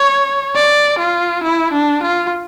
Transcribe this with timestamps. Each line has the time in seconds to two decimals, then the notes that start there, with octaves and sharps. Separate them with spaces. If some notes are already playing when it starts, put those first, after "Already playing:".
Already playing: C#5
0.55 D5
0.99 F4
1.43 E4
1.72 D4
2.02 F4